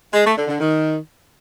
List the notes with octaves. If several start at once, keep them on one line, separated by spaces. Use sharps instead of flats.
G#3
A3
D3
D3
D#3